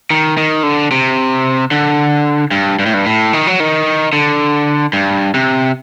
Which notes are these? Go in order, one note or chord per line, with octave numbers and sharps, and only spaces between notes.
D#3
D#3
D3
C3
D3
G2
G2
A2
G2
A2
D#3
F#3
D#3
D3
G2
C3